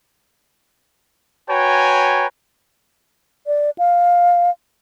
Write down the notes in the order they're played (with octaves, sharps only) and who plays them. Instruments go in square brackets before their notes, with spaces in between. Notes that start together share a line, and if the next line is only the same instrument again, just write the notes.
[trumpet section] F#4 B4 C#5 G5 G#5 A#5
[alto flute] D5
F5